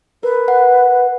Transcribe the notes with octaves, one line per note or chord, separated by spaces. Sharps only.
A#4 B4
F#5